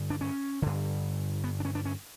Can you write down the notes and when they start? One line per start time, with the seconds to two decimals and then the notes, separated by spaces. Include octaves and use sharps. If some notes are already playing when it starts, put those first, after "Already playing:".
Already playing: G2 D3
0.10 D4
0.21 C#4
0.62 G2 D3
1.44 B3
1.60 D4
1.65 C#4
1.75 D4
1.85 C#4